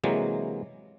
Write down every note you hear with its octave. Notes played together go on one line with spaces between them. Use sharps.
C3 E3 F#3 G#3 A#3